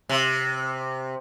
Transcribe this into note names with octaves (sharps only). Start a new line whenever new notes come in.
C3